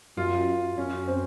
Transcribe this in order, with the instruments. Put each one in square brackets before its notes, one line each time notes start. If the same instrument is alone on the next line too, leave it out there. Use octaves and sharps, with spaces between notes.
[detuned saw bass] F#2 [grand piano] F4
[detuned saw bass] F#2 [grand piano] C#4
[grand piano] C4